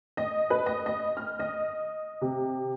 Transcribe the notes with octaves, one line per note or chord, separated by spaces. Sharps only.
D#5
B4
D#5
D#5
F6
D#5
C3